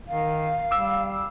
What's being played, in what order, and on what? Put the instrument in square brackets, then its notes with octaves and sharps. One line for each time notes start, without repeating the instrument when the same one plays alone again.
[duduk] D#3 [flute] F5
[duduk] G3 [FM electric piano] D6 E6